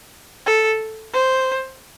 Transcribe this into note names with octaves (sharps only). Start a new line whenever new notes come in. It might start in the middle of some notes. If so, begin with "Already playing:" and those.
A4
C5